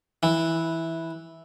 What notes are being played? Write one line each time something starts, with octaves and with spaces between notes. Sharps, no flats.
E3